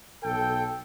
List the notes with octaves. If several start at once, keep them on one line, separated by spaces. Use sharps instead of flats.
B1 A4 G5